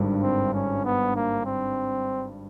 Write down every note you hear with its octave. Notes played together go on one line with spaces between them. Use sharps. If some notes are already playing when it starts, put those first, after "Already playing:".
Already playing: G#1 G2 D3
C4
C#4
B3
A#3
C4